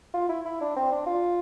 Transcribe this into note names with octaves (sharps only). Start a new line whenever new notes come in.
F4
E4
E4
D4
C4
D4
F4